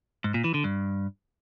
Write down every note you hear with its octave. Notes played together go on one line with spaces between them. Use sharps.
G#2
A#2
E3
D3
G2